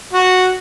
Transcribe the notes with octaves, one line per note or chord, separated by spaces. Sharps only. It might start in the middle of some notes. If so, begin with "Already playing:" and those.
F#4